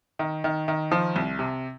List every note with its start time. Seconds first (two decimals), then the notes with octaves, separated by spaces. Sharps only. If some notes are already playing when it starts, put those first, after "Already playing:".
0.19 D#3
0.44 D#3
0.68 D#3
0.92 F3
1.16 C2
1.39 C3